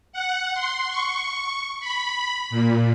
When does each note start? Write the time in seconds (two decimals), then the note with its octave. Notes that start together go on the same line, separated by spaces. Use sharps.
0.12 F#5
0.54 C6
0.89 C#6
1.80 B5
2.50 A#2